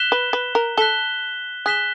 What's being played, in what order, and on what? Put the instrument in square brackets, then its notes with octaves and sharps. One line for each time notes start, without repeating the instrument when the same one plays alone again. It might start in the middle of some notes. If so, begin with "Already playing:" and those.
Already playing: [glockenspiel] F#6 B6 E7 G7
[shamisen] B4
B4
A#4
[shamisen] A4 [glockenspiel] F#6 B6 E7 G7
[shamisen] G#4 [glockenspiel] F#6 B6 E7 G7